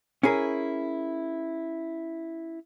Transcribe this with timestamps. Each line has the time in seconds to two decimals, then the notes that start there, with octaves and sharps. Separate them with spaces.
0.23 C#4 E4 G#4 A#4